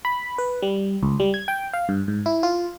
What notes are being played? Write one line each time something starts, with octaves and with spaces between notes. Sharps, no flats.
B5
B4
G3
C#2
G3
G#6
G5
F5
G2
G#2
E4
F4